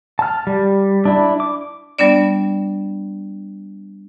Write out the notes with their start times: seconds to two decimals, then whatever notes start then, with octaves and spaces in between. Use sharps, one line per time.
0.19 A5 F6
0.47 G3
1.05 D4 E4
1.40 D6
1.99 G3 B3 D4 D5